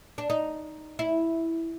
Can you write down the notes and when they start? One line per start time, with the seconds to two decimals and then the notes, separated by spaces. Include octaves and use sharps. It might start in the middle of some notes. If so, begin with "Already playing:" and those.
0.18 D4
0.30 D#4
0.99 E4